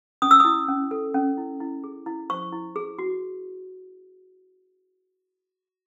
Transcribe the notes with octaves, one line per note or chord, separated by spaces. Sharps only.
C#4 D#6
E6
E4 D#6
C#4
A4
C#4
E4
E4
G#4
E4
C5 C#6
E4
G#4
F#4